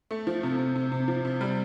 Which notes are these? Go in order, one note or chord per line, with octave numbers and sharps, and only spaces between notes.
A3
F3
C3
C3
C3
C3
F3
C3
G3